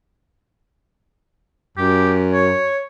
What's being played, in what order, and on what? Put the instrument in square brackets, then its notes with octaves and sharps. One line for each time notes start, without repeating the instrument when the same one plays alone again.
[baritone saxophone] F#2 [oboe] G4
[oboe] C#5